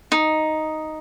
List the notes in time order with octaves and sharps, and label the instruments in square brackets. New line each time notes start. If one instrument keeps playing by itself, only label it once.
[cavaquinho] D#4